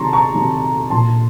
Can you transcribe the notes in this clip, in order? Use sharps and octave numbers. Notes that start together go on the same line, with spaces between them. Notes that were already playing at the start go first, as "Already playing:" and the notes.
Already playing: C3 D#3 F#3 A5 A#5 C6 C#6
A#5 C#6
C3 D#3 F#3
A#2 F#3 A5 C6